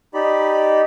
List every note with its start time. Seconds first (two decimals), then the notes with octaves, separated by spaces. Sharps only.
0.14 D#4 G4 D5 B5